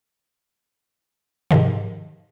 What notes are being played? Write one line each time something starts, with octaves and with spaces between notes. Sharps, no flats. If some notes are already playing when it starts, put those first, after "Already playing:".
G#2 C3 D#3 F3